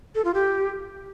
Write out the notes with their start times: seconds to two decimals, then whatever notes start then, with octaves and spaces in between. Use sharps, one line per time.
0.15 A4
0.25 F4
0.34 G4